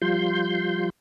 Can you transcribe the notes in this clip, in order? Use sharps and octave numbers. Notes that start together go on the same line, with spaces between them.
F3 G3 F4 C6 G6